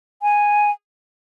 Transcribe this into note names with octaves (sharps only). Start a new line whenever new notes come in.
G#5